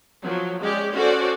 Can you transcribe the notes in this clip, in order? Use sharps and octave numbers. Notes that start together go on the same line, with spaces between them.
F3 F#3
G#3 C#4 G4 D5
C#4 F#4 A4 C5 D5